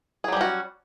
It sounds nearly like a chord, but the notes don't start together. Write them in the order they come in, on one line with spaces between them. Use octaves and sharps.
G#4 F#3 G3 C#4 F#4